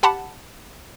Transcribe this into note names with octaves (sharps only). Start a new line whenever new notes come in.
G4 F#5 A5 B5